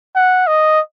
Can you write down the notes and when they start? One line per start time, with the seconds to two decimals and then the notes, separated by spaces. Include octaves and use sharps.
0.16 F#5
0.47 D#5